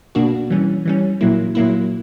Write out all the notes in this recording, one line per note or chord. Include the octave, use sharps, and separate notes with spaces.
B2 A#3 D4 F#4
E3 G3 C#4
E3 G3 C#4
A#2 F#3 A#3 E4
A#2 F#3 A#3 E4